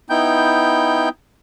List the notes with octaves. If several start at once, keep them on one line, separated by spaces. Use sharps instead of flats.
B3 D#4 E4 G5 G6